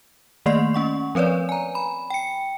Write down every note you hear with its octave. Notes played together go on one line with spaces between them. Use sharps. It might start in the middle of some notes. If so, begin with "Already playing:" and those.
D#3 A3 A#3 D5 D#5 C7
C#4 F#5 C#6
F3 C4 B4 C#5 D5
G#5 A#5
B5
G5 C#7